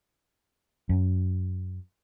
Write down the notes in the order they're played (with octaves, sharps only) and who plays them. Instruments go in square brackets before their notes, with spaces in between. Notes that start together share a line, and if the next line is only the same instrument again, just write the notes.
[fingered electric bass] F#2